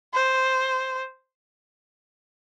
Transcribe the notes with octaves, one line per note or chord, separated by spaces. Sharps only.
C5